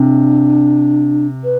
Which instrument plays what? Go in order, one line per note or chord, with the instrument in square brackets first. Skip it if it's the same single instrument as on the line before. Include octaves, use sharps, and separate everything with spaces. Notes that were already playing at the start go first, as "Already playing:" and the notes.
Already playing: [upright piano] C3 [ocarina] D4
[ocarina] B4